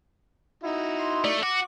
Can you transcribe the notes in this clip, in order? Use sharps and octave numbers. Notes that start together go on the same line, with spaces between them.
D#4 E4 F#4
C6
A3 D5
F#4 D6